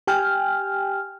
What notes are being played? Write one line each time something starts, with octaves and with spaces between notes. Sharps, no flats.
G4 G5 G#5 F6